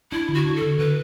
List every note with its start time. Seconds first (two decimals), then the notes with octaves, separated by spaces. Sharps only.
0.12 D4 E4
0.28 D3
0.34 F#4
0.45 D4
0.56 A4
0.62 D3
0.78 D3 B4